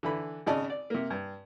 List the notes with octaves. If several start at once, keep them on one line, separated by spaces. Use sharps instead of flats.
D3 E3 B5
G#1 C#3 D5 D#5 A5
D5
C3 A#3
G2